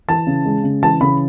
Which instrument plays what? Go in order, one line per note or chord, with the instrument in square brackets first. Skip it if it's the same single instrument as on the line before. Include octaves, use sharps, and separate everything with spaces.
[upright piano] E3 A5
C#3
G#3
C#3
E3 A5
C#3 B5